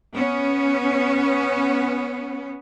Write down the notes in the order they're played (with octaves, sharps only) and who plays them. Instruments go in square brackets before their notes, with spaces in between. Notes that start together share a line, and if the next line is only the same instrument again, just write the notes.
[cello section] B3 C#4